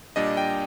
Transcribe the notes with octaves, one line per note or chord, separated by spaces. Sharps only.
A#2 G3 D4 D#5
G5